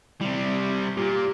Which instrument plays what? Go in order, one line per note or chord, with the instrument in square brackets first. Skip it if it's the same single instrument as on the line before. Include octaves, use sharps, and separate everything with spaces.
[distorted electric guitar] C3 G3 [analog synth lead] E4
[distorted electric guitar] A#2 [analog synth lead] G4